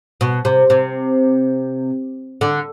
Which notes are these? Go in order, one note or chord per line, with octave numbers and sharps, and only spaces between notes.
B2
C3
C3
D3